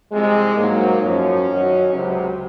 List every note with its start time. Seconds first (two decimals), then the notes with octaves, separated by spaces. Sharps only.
0.12 C2 C3 F3 G#3
0.57 G#2 F#3 A#3
1.02 F#2 F3 C#4
1.48 F#2 D#3 F#3
1.93 C#2 C3 F#3